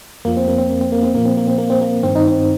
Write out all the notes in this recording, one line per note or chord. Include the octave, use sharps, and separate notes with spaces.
F2 F3 A#3
C4
A#3
C4
A#3
C4
A#3
C4
A#2 F3 A#3
C4
A#3
C4
A#3
C4
A#3
G2 D#3 C4
D#4
C4